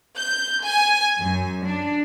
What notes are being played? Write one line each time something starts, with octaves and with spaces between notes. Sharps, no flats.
G6
G#5
F#2
D4